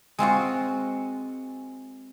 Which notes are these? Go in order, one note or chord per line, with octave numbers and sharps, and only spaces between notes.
G#3 C4 F4 F#4